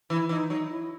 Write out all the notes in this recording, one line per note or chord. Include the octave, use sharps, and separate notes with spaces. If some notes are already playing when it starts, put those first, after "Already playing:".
E3 E4
E3 D#4
F#3 D#4
E4